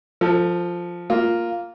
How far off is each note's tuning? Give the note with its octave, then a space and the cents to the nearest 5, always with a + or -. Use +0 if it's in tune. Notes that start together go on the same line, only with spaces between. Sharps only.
F3 +0 A4 +25
A#3 +0 F4 +0